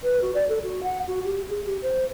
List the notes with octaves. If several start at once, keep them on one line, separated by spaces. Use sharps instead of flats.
B4
F#4
D5
A4
F#4
F#5
F#4
G4
G#4
G4
C5